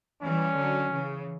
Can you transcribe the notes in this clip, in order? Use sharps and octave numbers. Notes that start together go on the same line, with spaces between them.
E3 G3 C#4
D3 F#3
C#3 E3